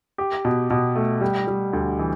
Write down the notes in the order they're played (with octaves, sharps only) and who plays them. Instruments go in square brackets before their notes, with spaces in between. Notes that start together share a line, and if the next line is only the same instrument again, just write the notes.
[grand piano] G4
B2
B2
A3
G3
G3
D2
E3